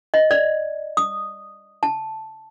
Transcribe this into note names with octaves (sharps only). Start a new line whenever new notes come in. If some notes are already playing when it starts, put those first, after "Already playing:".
D#5
D5
D#6
A5